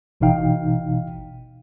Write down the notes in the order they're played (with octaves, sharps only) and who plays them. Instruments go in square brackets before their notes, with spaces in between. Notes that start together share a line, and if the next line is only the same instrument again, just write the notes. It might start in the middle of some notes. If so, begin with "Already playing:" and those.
[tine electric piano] G#1 B2 E3 D#4 F5 G5